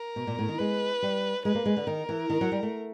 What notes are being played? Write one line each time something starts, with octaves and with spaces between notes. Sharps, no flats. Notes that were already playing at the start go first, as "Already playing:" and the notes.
Already playing: A#4
B2
A#2
A2
D#3
G#3 B4
G3
G#3 B4
A#3
G#3
D3
D#3 A#4
E3
D#3
F#3
G3
A3